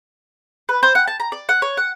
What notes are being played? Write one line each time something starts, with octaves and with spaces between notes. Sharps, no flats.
B4
C5
F#5
A5
A#5
D5
F#5
C#5
F#5